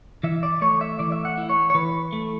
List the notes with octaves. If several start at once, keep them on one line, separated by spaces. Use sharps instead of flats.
E3 E5
D5
A3 C#5
E5
E3 D5
E5
F#5
E4
C#5
C#5
E3 B4
A3